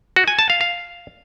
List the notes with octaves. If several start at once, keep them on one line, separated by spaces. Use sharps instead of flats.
F#4
G#5
A5
F5
F5